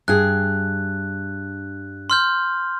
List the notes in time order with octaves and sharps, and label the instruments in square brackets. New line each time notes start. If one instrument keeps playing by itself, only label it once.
[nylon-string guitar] G2 G#4 [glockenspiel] F#6
[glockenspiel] C6 F6 G6